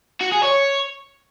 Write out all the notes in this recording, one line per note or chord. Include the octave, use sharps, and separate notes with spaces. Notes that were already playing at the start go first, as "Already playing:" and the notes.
F#4
G#4
C#5